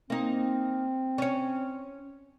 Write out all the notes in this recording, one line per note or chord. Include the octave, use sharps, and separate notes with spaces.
A#3 C4 D#4
C#4 C#5